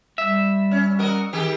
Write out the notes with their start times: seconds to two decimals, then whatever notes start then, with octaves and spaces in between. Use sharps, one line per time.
0.18 G3 E5
0.71 C#4
0.99 F#4 A#4 D#5
1.33 D#3 G4 G#4